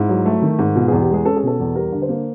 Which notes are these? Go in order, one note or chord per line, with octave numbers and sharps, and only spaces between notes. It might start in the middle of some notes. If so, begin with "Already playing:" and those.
Already playing: G#2 E4
F#3
A3
D#3
G#2
B2 F4
E2 G#4
G4
G#3 G#4
C#4 A4
G#4
B2 A4
E2
G3 A#4
D3
C5
A#3